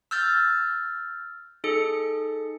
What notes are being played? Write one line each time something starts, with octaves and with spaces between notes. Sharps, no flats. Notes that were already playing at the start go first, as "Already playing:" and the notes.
E6 F6 G6 A6
D#4 G#4 A4 C#7